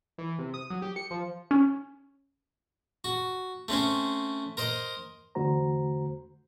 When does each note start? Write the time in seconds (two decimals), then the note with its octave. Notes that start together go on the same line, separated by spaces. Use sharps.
0.18 E3
0.39 C3
0.54 D#6
0.70 F#3
0.82 G4
0.96 C#7
1.11 F3
1.51 C#4
3.04 F#4
3.68 A3 C4 C#4 C5
4.57 A#4 C5 D#5
5.35 E2 D3 A3 F#4 C5 A#5